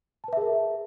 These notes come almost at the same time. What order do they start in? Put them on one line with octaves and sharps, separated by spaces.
A5 B4 E5 G#4 A#4